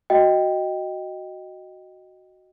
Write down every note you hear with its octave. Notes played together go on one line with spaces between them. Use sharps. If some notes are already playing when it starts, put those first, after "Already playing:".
F#4 D#5 G5